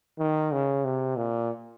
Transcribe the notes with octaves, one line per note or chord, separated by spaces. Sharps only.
D#3
C#3
C3
A#2